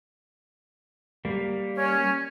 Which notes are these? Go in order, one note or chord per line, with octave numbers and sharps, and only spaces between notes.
G3 A#3
C#4